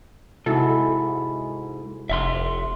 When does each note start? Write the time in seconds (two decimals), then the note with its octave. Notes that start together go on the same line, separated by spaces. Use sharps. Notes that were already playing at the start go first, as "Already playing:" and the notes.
0.46 G#2 C3 E4 F#4 A4
2.10 F1 E5 F#5 C6